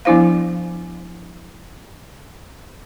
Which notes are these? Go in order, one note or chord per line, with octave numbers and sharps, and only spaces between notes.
F3 B3 D4 E4 C5 F5